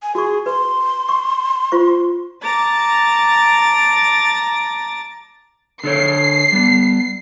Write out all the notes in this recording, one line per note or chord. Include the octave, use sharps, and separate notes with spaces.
G#5
F#4 G#4 C#6
B4 C6
C#6
F4 C5 C#6
A5 A#5 D6 A6
D3 A4 C#5 C7
G3 B3